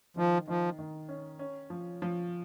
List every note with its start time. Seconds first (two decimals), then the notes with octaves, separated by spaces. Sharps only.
0.17 D#3 F3
0.48 D#3 F3
0.79 D#3
1.09 C#4
1.39 C#4
1.70 F3
2.02 F3